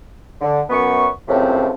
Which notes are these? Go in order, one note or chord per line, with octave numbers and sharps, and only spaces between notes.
D3
F#2 B3 C#6
C#2 F#2 A2 C3 F3 C4